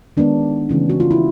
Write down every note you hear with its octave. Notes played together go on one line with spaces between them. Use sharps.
D#3 G#3 B3 D4
C#3 E3 A3 C#4
F#4
F4
E4